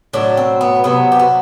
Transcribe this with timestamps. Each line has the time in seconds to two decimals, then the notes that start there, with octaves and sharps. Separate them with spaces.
0.13 A2 F#3 A3 D4
0.37 C4
0.61 B3
0.84 C3 F#3 A3 B3
1.12 G4
1.19 F#4